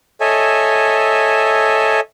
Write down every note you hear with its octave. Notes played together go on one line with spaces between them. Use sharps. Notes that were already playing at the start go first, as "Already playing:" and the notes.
A4 C#5 D#5 E5 G#5